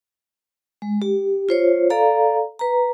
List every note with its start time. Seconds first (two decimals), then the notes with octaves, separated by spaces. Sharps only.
0.82 G#3
1.02 G4
1.49 F4 C5 C#5
1.90 A4 D5 F5 A#5
2.59 B4 A#5